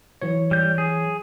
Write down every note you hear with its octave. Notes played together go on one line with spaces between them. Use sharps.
E3 F#3 C#5
G3 G6
G#4